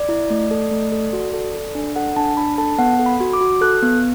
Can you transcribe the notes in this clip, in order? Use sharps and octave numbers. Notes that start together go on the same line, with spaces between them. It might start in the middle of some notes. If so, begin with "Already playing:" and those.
Already playing: D5
E4
A3
A4
A3
A4
F#4
A4
A4
D4
A4 F#5
D4 A5
D4 B5
A4 A5
B3 F#5
A4
B5
F#4
D6
F#4
A4 F#6
B3